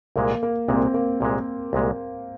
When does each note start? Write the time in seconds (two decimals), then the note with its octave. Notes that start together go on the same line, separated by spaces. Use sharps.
0.16 C2 A#2 G#3 A#3
0.43 A#3
0.68 C2 A#2 G#3 C4
0.94 A#3
1.21 C2 A#2 G#3
1.73 C2 A#2 G#3